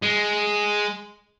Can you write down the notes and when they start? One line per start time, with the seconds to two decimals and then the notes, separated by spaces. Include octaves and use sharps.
0.02 G#3